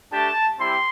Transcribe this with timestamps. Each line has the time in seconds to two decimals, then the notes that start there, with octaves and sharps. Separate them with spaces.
0.12 A3 D4 G4 A5
0.59 G3 C4 E4 G4 C6